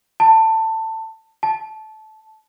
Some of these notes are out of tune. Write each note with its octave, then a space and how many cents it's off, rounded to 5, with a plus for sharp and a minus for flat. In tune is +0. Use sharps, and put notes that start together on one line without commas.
A5 +20
A5 -20